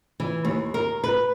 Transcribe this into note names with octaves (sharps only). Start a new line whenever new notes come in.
E3
D#2
A#4
B4